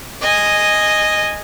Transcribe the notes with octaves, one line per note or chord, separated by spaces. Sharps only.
D#5 G#5